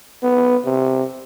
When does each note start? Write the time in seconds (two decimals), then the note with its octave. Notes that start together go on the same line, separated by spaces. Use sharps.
0.23 B3
0.65 C3